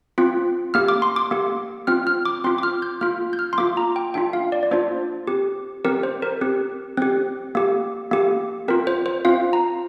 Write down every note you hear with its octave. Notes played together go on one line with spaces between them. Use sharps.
C4 F4
A#3 G4 F6
D6
C6
D6
A#3 G4
C4 F4 F6
F6
D6
C4 F4 C6
D6
F6
G6
A#3 F4 F6
G6
F6
C6
A#3 F4 D6
A#5
G5
A#3 D4 F4 G5
F5
D5
D5
A#3 D4 F4 C5
C4 G4
C4 G4 A#4
C5
A#4
C4 G4
C4 G4
A#3 G4
A#3 G4
C4 F4 A#4
C5
C5
C4 F4 F5
A#5